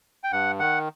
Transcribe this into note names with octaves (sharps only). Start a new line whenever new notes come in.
G5
G2 F#5
D#3 F#5